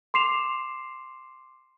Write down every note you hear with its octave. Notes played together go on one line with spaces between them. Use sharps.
C6 D6 C7 E7 F7